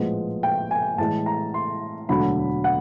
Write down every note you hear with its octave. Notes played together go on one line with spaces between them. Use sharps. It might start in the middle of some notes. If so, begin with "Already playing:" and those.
Already playing: A#1 A2 F3 G#3 B3
G5
G#5
A2 E3 G#3 A5
A#5
C6
E1 D2 D3 F#3 A3 B5
F#5